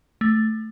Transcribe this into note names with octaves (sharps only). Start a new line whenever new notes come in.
A3